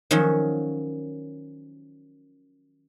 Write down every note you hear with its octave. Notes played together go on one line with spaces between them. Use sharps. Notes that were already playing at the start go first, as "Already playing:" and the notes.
D#3 F3 F#3 C#4